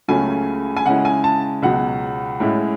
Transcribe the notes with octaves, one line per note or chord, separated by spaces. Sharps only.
C#2 C#3 F#3 A3 C#4 G#5
G#5
C#3 G#3 C#4 E4 F#5
G#5
A5
C#2 B2 F#3 F#5
A2 G#3 C#4 E4